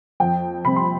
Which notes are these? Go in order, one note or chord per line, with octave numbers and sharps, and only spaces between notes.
F2 G5
C3 G3 C4 B5
C6